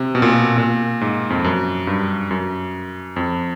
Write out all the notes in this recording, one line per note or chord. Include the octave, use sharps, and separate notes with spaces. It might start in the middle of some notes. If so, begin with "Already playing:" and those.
Already playing: C3
B2
A#2
B2
A#2
G#2
F2
F#2
G2
F#2
F2